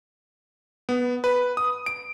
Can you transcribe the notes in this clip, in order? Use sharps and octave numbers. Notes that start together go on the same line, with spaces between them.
B3
B4
D#6
D7